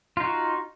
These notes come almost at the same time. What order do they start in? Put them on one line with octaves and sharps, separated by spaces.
F4 D#4 F#4